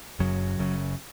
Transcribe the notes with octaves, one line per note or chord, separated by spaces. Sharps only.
F#1 F#2 C#3 F#3
F#1 F#2 C#3